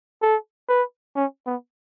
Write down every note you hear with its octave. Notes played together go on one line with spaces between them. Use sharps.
A4
B4
C#4
B3